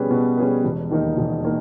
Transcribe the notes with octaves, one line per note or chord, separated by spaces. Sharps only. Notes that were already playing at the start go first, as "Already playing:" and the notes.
Already playing: B2 G3 C#4 G#4 B4
B2
G3 C#4 G#4 B4
E1
D#2 D#3 A#3 D#4
E1
D#3 A#3 D#4